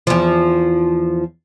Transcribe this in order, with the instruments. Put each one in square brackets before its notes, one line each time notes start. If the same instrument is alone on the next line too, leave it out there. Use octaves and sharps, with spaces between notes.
[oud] E2 F3